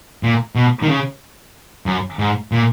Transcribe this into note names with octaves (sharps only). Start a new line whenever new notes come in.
A#2
B2
D#3
C#3
F#2
G#2
A#2